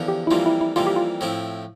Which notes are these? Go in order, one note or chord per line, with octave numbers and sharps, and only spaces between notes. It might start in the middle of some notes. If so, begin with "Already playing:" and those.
Already playing: E2 D3 F3
G4
E4
F2 E3 G3 A#3 F4
E4
E4
F2 E3 G3 A#3 F4
G4
F4
A2 F3 C4 E4